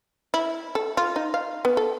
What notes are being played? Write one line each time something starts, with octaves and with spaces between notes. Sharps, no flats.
E4
A4
F4
D#4
F5
B3
A4